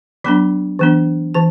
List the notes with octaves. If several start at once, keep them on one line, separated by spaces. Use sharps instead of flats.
F#3 B3 D4 B5
E3 B3 D4
E3 A5